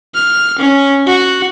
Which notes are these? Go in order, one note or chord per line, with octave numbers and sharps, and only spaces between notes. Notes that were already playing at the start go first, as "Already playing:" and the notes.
F6
C#4
F#4